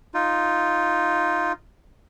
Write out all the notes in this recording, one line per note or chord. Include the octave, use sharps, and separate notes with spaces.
D#4 F4